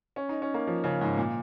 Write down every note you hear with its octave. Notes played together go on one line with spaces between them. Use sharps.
C#4
D#4
C#4
A#3
F3
C#3
G#2
A#2